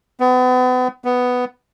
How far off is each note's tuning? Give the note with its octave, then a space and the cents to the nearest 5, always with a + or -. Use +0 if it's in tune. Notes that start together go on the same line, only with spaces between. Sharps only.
B3 +35
B3 +5